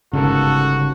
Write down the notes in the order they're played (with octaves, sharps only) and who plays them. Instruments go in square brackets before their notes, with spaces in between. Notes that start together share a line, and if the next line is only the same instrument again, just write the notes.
[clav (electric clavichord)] G1 G#2 A#4 [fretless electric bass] C#3 [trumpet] F#4 [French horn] A4